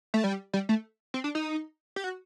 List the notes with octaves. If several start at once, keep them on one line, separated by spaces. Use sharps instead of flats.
A3
G3
G3
A3
C4
D4
D#4
G4
F#4